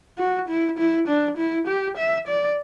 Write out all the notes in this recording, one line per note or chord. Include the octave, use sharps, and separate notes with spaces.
F#4
E4
E4
D4
E4
G4
E5
D5